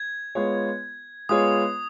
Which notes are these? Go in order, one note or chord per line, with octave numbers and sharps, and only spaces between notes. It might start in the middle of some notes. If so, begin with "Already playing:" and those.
Already playing: G#6
G#3 B3 F4 G#4 C#5
G#3 B3 F4 G#4 C#5 D#6